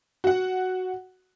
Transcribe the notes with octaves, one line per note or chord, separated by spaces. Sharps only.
F#4 F#5